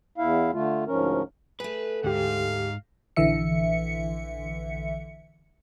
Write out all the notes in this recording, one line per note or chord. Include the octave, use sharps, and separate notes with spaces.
E2 E4 F5
D3 A3 F4
D2 G#2 F3 C#4 A#4
A3 G#4 B4
D2 G#2 G4 F5
A#1 D3 E3 E5 C#7